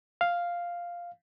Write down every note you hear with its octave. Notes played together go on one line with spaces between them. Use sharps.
F5